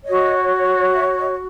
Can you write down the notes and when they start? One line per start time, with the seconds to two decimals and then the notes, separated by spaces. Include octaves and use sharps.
0.04 C#5 D#5
0.09 F#4
0.94 E5
1.16 D#5